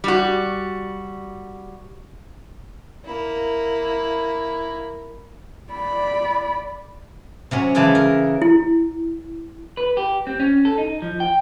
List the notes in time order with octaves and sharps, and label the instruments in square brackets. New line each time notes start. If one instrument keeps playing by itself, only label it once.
[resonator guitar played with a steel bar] G3 F#4
[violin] A#3 E4
[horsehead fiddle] D5 B5
[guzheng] C3 F#3 C#4
C#3 E3 G#3 D5 A5 B5
A#4
[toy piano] E4
[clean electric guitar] B4
G4
C4
C#4
A4
D#4
F3
G5